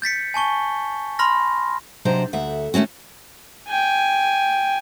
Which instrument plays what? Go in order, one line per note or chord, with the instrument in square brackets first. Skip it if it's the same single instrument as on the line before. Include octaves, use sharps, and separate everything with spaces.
[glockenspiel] G6 A6 B6 C#7
G#5 A5 C#6 G7
B5 C6 F6 A#6
[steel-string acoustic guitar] C3 F#3 D4 C5 D#5 A#5
D2 E5 F#5
D#3 A3 A#3 C#4 F#4
[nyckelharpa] G5 G#5